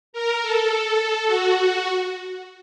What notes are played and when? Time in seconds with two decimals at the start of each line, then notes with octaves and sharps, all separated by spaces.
0.13 A#4
0.42 A4
1.27 F#4